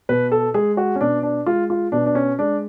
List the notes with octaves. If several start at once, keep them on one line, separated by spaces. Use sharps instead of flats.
B2 B4
A4
G#3 G#4
F#4
C#4
B2 D4
D4
G#3 F4
F4
B2 D4
D4
C#4
G#3 D4